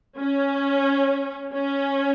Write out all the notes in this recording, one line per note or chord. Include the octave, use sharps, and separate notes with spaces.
C#4
C#4